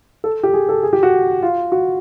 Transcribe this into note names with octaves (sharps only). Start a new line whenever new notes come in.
A4
G4
G#4
A4
G#4
G4
F#4
F4
F#4